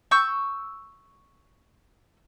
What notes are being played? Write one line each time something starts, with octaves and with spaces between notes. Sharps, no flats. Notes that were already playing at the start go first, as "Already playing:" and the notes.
C#6 E6 G6